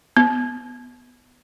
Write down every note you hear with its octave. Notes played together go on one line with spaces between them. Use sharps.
B3